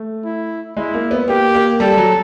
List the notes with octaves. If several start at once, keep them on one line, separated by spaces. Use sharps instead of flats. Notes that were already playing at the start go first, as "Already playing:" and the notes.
Already playing: A3
E4
G#3 E4
A#3
B3
A#3 G4
A#3
G3 A4
F#3